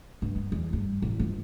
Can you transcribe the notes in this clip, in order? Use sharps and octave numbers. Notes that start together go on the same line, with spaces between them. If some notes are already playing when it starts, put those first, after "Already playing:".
G2
B3
E2
G2
A1
G1